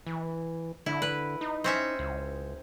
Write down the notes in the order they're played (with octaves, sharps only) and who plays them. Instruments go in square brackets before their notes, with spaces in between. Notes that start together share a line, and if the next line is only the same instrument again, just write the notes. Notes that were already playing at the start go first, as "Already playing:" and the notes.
[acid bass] E3
[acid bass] D3 [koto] E4
[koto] B4
[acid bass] D#4
[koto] C4 C#4 E5
[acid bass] C#2